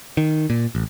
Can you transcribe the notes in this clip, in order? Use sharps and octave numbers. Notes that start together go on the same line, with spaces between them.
D#3
A#2
A1